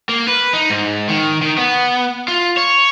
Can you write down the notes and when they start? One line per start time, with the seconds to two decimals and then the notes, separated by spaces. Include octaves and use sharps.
0.09 A#3
0.27 B4
0.53 D#4
0.70 G#2
1.09 D#3
1.42 D#3
1.58 B3
2.28 F4
2.57 C#5